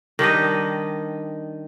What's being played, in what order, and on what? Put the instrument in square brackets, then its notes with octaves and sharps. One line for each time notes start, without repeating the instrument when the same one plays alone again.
[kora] D#3 G3 D4 D#5